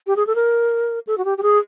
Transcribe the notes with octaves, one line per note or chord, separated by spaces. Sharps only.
G4
G#4
A4
A#4
A4
F#4
G4
G4
G#4